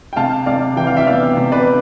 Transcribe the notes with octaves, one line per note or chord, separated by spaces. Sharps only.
G5
C3 F5 A5
C3 D5 F5
E3 G5
F5
E5 G5
B3 D5 F5
C3
B4 D5